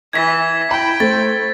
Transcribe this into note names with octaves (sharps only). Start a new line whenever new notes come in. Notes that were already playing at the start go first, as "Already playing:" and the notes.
E3 G#6 B6
E4 G5 B5
A3 C5 A6